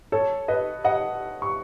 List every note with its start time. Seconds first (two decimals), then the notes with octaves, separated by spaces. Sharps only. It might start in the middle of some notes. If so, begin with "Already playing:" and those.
0.12 A4 C#5
0.48 B4 D#5
0.84 D#5 F#5
1.42 C#6